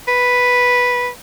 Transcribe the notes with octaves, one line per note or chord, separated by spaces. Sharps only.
B4